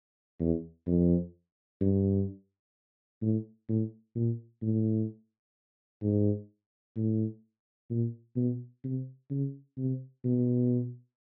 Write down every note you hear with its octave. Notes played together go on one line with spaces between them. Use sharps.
E2
F2
G2
A2
A2
A#2
A2
G#2
A2
A#2
B2
C3
C#3
C3
B2